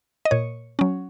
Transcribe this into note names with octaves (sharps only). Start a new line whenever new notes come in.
D#5
A#2 C#5
F#3 C#4